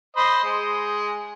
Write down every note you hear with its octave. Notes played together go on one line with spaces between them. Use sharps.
C5 D#5 B5
G#3